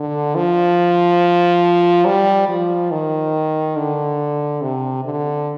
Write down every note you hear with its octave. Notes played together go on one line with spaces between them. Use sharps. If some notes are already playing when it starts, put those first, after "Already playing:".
Already playing: D3
F3
G3
F3
D#3
D3
C3
D3